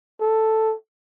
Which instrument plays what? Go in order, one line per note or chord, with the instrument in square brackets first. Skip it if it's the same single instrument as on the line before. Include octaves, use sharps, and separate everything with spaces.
[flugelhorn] A4